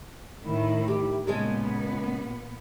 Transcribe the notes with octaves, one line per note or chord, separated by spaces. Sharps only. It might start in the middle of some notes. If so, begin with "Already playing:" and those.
A2 D#3 E4
G4
A#2 C#3 G#3 B3 D4